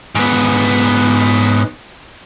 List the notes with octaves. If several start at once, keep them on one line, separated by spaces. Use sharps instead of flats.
G#2 B3